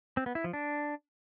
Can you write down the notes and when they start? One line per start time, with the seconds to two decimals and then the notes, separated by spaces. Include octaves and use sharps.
0.17 C4
0.26 B3
0.35 E4
0.44 F3
0.53 D4